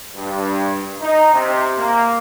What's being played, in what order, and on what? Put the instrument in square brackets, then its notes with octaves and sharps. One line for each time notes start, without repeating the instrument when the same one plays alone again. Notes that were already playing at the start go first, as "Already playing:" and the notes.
[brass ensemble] G2
D#4
C3
A#3